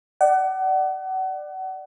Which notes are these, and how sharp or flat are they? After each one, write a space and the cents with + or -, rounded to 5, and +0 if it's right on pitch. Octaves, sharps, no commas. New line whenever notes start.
D5 +20 F#5 +30